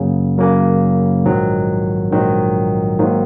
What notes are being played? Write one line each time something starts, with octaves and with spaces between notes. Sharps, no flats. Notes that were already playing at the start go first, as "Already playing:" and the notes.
Already playing: F#2 C#3 F#3 A#3 C#4
F#2 C#3 F#3 A#3 C#4
A#1 G#2 D#3 F#3
A#1 G#2 D#3 F#3
G#2 D#3 F#3 A#3 D#4